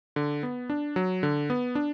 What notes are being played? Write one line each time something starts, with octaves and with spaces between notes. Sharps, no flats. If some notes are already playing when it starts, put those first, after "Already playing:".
D3
B3
D4
F#3
D3
B3
D4